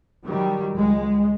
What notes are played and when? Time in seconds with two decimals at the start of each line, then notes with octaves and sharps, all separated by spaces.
0.24 D#3 F#3 G3
0.75 C#2 G#3